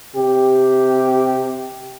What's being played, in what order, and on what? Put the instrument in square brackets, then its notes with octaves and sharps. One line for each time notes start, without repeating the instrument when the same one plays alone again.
[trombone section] C3 G4